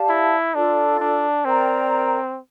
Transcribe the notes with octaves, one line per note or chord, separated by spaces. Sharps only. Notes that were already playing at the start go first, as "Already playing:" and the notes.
Already playing: G4 D5 F5 A5
E4
D4 F4 A4 D5
D4
C4 A#4 D5 G5 A#5